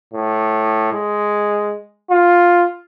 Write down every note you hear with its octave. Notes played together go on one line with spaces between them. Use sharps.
A2
G#3
F4